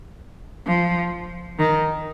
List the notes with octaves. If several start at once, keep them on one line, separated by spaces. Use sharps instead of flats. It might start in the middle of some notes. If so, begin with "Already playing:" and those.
F3
D#3